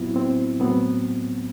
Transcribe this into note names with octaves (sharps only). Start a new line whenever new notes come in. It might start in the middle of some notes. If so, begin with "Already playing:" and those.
Already playing: A2 F#3 B3 C4 E4
C4
A2 F#3 B3 C4